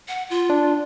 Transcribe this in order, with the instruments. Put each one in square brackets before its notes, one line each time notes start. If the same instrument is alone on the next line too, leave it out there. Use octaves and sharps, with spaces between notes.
[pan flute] F#5
F4
[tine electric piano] D4